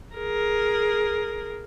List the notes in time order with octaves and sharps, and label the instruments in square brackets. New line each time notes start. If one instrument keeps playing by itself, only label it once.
[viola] G#4 A#4